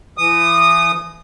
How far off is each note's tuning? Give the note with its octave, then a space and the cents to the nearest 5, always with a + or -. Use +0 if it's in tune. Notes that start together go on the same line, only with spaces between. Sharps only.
E3 +35 D#6 -15